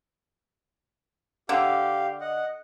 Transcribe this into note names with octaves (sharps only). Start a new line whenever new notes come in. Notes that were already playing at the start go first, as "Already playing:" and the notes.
D3 G4 F5
D#5 F#5